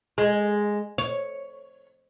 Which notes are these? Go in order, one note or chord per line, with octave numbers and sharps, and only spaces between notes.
G#3
C#5